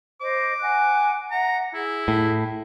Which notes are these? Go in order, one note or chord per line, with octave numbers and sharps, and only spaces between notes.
C5 D#5 D6
F#5 G#5 F#6
E5 F#5 A#5
E4 G#4
A2